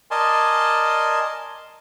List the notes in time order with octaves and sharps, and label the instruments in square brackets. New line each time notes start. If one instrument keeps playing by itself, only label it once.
[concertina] A#4 D5 D#5 G#5 A5 C6